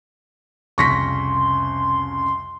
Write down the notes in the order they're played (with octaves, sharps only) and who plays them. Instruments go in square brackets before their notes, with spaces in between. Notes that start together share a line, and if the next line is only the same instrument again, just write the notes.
[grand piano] C2 F2 C#3 [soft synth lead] C6 [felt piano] C#6 A#6 B6